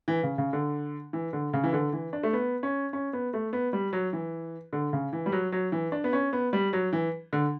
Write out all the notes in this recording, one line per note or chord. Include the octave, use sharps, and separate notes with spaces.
E3
C#3
C#3
D3
E3
D3
C#3
E3
D3
E3
D4
A3
B3
C#4
C#4
B3
A3
B3
G3
F#3
E3
D3
C#3
E3
G3
F#3
F#3
E3
D4
B3
C#4
B3
G3
F#3
E3
D3